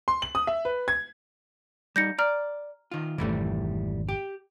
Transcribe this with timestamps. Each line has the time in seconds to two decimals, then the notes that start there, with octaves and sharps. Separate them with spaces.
0.08 C6
0.22 F#7
0.35 D#6
0.47 E5
0.65 B4
0.88 G#6
1.96 G3 D#4 G6 A#6 C#7
2.19 D5 A#5 F6
2.91 D#3 F4
3.18 G#1 F2 C3 E3 G3 A3
4.09 G4